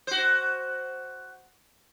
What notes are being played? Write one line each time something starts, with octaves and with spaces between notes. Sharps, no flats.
F#4 C5